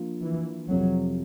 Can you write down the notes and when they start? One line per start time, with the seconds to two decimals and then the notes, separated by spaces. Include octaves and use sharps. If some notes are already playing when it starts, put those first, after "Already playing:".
Already playing: F3 A#3 D4 F4
0.22 E3
0.70 F2 C3 F3 F#3